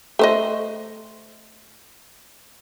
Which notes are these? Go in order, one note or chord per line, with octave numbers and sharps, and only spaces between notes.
A3 C5 D#5